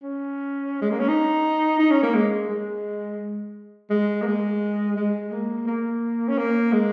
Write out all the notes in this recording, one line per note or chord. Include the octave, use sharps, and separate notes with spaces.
C#4
G#3
A#3
C#4
D#4
D#4
C#4
A#3
G#3
G#3
G#3
A#3
G#3
G#3
A#3
A#3
C#4
A#3
G#3